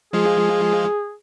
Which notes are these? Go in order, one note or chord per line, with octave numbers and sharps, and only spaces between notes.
F3 G#3 F4 G#4